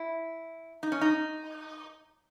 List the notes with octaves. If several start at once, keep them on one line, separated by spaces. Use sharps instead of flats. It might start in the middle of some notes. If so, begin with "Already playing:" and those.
Already playing: E4
D#4
C#4
D#4